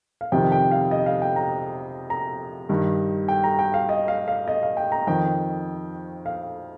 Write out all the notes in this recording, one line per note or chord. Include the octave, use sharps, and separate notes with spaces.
F5
F2 C3 D#3 G5
G5
F5
D#5
F5
G5
A#5
A#5
G2 D#3
G5
A#5
G5
F5
D#5
F5
F5
D#5
F5
G5
A#5
F2 D#3 G5
F5